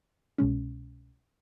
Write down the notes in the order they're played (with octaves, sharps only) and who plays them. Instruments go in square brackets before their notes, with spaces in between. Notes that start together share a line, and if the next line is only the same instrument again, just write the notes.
[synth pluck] C2 B2 G#3 C#4